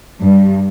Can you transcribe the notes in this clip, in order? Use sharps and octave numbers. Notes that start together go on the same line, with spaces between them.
G2